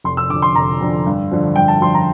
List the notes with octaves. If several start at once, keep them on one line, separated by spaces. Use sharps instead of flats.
F1 C6
E6
F2 D3 D6
C6
F1 A#5
F2 D3
G2
D3 F3
G2 G5
A5
D3 F3 C6
A#5